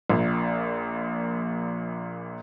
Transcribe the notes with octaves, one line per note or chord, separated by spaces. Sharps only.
A#1 A#2